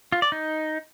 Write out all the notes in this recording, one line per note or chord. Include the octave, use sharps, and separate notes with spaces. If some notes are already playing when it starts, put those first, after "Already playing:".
F4
D5
D#4